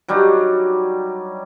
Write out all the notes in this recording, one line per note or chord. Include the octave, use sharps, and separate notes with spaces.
F#3 G3 D4 D#4